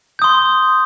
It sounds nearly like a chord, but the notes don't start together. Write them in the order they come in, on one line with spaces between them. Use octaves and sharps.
G6 D#6 C6